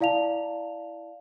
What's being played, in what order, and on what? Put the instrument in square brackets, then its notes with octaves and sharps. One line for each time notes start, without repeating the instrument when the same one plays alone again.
[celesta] E4 D5 F5 A5 F7